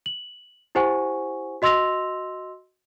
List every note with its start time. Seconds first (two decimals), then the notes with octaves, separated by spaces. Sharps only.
0.06 F#7
0.75 E4 G4 C5 F#5 G#5 C#6
1.62 F#4 D#5 C6 E6 A#6 F7